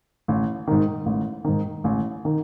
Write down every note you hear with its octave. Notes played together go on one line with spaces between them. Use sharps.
A1
G#2 D#3
A1
G#2 D#3
A1
D#3